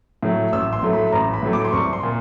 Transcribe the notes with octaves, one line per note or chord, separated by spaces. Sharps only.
A2 F#3 A3
A1 E6
C6
A2 F#3 A3
B5
A1 A#5
B5
A2 F#3 A3
D6
C6
C2 C#6
C6
A#2